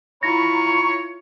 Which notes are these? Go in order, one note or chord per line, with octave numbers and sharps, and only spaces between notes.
E4 F4 C#5 A#5 B5 C#6 A#6